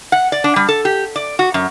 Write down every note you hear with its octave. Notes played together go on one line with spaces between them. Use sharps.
F#5
D5
D4
G3
A4
G4
D5
F#4
F#2